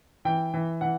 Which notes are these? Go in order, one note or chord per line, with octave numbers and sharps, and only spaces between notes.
E3 G5
E3
E3 F#5